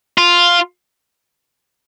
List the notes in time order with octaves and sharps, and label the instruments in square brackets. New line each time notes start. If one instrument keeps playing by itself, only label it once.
[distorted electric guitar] F4